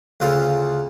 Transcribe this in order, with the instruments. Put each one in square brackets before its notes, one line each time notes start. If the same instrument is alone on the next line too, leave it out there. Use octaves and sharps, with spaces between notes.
[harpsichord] D2 C#3 F4 A4